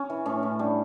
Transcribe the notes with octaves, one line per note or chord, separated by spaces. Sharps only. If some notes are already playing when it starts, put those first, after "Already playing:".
Already playing: C#4
E3
A2 C#4
A2
G3 D4